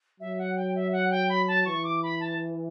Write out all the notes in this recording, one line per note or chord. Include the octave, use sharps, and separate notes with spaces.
F#3 E5
F#5
G5
E5
F#5
G5
B5
A5
E3 C#6
D6
B5
A5